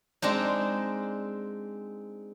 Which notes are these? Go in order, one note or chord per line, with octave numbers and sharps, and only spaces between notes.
G#3 C4 D4 D#4